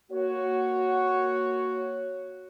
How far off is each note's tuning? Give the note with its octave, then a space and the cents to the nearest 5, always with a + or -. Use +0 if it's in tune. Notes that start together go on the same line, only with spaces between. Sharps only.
A#3 +0 F#4 +0 C#5 +0